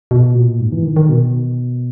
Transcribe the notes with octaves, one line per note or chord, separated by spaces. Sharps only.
B2
A#2
G#2
E3
D#3
D#3
B2